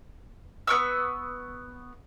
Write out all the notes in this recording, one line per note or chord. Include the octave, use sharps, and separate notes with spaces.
B3 A#4 C#6 E6